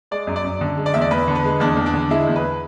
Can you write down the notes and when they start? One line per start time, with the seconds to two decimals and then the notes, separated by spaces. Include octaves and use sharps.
0.11 G#3 D5
0.27 F#2
0.36 D5
0.44 F#2
0.61 D3
0.77 G#3
0.86 D5
0.94 E2 E5
1.01 D5
1.11 E2 B4
1.28 D3
1.35 B4
1.44 G#3
1.60 E2 D4
1.77 E2
1.86 D4
1.94 D3
2.10 G#3 E4
2.27 E2
2.36 B4